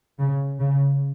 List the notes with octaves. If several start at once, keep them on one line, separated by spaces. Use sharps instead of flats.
C#3
C#3